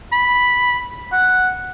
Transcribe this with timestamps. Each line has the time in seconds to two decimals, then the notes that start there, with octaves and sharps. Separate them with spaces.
0.12 B5
1.12 F#5